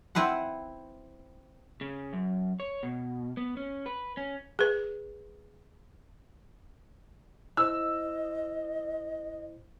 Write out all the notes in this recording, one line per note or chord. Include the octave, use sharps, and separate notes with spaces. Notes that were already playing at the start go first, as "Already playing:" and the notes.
C4 E4 B4 C5 F#5
C#3
F#2
C#5
B2
B3
C#4
B4
C#4
G#4 B4
E4 C5 D#5 E6